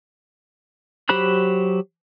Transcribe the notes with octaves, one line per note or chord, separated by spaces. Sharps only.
F#3 G4 C5 B5 F#6